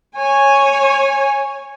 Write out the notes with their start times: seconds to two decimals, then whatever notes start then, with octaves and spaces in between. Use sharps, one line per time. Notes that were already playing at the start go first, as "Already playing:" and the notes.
0.16 C#5 G#5